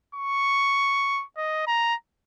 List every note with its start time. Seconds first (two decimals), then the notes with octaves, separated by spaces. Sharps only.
0.15 C#6
1.37 D#5
1.67 A#5